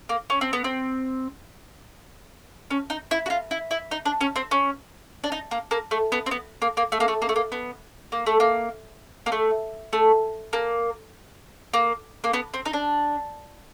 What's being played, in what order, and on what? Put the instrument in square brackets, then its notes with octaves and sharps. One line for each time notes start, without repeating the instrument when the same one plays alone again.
[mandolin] A#3
C#4
C4
B3
C4
C#4
D#4
E4
F#4
F4
E4
E4
D#4
D4
C#4
C4
C#4
D4
D#4
A#3
A#3
A3
B3
C4
B3
A#3
A#3
A3
A#3
A3
A#3
A3
A#3
B3
A#3
A3
A#3
A#3
A3
A3
A#3
A#3
A#3
B3
C4
D#4
D4